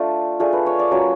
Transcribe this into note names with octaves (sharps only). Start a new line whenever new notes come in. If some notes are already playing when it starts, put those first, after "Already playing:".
Already playing: A3 D4 F4
A3 D4 F4 G#4
B4
C#5
D5
F#3 A#3 C#4 F4 C#5